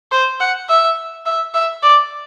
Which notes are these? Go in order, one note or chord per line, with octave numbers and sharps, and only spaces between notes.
C5
F#5
E5
E5
E5
D5